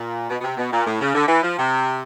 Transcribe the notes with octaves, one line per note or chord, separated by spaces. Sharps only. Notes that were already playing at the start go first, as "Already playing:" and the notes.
Already playing: A#2
B2
B2
C3
B2
A#2
A2
C#3
D3
E3
F3
C3